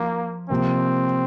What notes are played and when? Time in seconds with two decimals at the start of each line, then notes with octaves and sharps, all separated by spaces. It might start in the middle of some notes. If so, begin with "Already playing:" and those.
Already playing: F3 A#3
0.50 C3 F3 A#3 C4